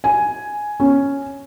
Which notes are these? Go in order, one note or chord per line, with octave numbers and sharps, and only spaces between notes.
G#5
C#4